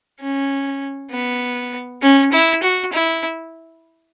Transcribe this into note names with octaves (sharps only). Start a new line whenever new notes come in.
C#4
B3
C#4
E4
F#4
E4